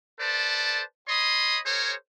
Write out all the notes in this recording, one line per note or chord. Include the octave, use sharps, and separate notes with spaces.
A4 B4 C5 D5 A5
C#5 D#5 B5 C6 D#6
G#4 A#4 C5 C#5